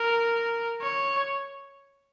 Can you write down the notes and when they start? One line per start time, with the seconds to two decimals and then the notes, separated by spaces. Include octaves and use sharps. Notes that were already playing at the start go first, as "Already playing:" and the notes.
Already playing: A#4
0.82 C#5